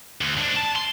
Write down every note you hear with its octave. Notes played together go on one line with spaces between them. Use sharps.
D2
G#2 D4
A5
C6